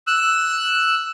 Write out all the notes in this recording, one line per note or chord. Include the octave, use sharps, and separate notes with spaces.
E6 F#6